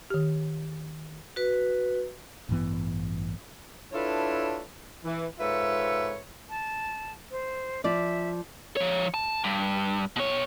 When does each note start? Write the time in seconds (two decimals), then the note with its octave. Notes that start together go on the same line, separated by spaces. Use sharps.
0.10 D#3 G4
1.36 F#4 B4
2.49 A1 G2 E3 B3
3.92 D4 E4 F4 A4 B4 C#5
5.05 E3
5.39 G#2 F4 A4 B4 C#5 E5
6.50 A5
7.31 C5
7.84 F3 D5 E5
8.77 F3 C#5
9.14 A5
9.44 G2
10.16 B2 C#5